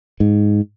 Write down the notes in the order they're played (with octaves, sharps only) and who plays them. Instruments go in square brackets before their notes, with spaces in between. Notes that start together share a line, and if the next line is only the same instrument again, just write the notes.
[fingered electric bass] G#2